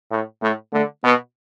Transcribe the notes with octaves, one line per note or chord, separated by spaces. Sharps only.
A2
A2 A3
D3 A3
B2 B3